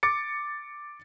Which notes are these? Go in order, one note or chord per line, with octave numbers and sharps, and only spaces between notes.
D6 A6 C#7